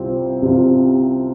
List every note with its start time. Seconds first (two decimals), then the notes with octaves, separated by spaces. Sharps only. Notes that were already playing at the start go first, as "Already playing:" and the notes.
Already playing: C2 C3 G3 C4 F4
0.42 C2 C3 G3 C4 F4